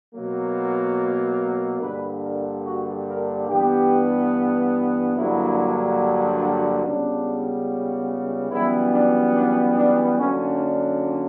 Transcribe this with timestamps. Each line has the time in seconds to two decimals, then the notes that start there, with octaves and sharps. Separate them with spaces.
0.13 B2 F#3 A#3
1.81 G2 D3 A#3 B4
2.23 A#4
2.65 F#4
3.07 A#4
3.48 G2 E3 B3 G4
5.16 G2 D3 F#3 A#3 E4
6.83 C#2 C#3 G3 B3 D4
8.50 F#2 E3 G3 B3 E4
8.92 D4
9.34 D4
9.76 D4
10.18 F#2 D3 F#3 A#3 C#4
10.59 D4